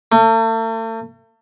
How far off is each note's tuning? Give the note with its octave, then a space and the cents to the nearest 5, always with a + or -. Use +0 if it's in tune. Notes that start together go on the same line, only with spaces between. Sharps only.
A3 +40